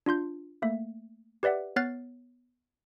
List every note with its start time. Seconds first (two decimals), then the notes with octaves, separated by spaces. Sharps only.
0.06 D4 F4 C6 G6
0.62 A3 A#3 E5
1.43 G4 B4 D5 E5 F#5
1.76 B3 C#5 F6 F#6 A6 C7